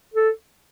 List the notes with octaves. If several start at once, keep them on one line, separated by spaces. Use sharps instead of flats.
A4